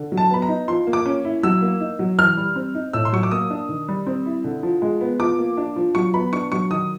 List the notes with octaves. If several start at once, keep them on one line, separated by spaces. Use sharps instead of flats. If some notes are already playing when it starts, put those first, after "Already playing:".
Already playing: D3
F#3
A5
B3 B5
A#5
D#4
F3 C6
A#3
D6
C#4
E4
F#3 E6
A#3
D#4
F#3
E3 F6
G3
C4
D#4
A2 E6
C6
F#3 C#6
D6
A#3 D#6
D4
D#3
G3
C4
E4
D3
F3
G#3
B3
F3 D6
A#3
D4
F3
F#3 C#6
B3 B5
D4 C#6
F#3 C#6
D#3 D#6